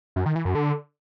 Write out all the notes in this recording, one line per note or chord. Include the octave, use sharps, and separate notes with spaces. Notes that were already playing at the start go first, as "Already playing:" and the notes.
F#2
D#3
E3
F#2
D3